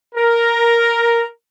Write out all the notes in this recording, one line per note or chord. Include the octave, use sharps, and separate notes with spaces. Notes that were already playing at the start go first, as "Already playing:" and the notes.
A#4